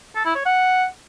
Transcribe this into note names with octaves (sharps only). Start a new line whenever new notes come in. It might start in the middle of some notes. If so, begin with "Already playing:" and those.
A4
E4
C#5
F#5